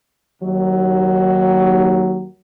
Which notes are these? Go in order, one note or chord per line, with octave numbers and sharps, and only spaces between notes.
D#2 F#3